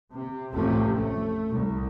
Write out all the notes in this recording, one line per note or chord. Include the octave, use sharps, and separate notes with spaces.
C3
A1 F2 C3 A3
A3
C2